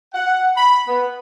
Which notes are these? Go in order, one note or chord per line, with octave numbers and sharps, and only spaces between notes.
F#5
B5
B3